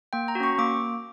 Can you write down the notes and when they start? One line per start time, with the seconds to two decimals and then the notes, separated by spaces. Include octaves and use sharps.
0.13 A#3 G5
0.28 A#5
0.35 F#4
0.40 C#4 C#6
0.58 A#3 D6